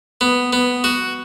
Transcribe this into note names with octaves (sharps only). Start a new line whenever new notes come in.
B3
B3
F#4